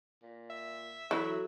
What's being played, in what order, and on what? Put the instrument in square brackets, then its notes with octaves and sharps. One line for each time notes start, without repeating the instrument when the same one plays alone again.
[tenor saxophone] A#2
[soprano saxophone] E5
[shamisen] E3 E4 [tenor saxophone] F#3 [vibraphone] F#4 A4